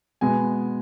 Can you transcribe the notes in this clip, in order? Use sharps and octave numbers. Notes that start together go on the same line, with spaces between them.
B2 G#3 B3 G#5